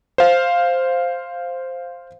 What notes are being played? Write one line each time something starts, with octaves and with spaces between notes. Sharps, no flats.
C5 F5